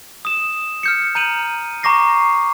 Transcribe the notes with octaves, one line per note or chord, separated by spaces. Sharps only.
D#6 E7
F6 G6 C#7
A#5 G6 D#7 F#7
A#5 C#6 D6 A#6 C7